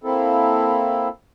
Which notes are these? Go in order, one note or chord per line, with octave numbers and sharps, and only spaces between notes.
A#3 C4 E4 A4